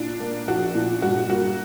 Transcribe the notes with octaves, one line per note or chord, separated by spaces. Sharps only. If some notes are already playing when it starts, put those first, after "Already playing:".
Already playing: A#2 D4
A#3
A#1 F#4
A#2
G2 F#4
A#3 F#4